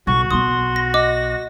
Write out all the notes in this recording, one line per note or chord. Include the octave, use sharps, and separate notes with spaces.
B1 F#4 C#6
B1 B3 C6 D#6
A#6
D#5 D6 A#6